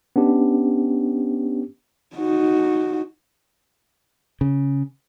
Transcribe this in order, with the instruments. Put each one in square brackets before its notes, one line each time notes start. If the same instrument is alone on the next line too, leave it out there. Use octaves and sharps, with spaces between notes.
[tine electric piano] B3 C#4 D4 G4
[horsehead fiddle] D#4 F#4
[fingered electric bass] C#3